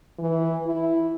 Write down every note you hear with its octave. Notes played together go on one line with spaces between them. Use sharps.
E3
E4